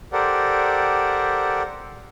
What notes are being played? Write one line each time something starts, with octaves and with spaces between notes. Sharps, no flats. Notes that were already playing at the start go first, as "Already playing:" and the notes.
G4 A4 A#4 C5 D5 F#5